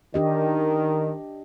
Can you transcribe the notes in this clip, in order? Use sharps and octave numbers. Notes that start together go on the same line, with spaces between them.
D#3 D4 G4 D#5